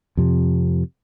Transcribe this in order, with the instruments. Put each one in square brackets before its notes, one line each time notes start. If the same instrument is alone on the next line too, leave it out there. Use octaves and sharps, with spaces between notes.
[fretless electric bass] F2 C3